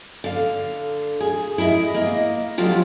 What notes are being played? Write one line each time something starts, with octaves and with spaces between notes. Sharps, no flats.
D3 F5
G#4
E4 G#4 A#4 D#5 E5
A#3 D#5
D3 F3 F#3 F4 G4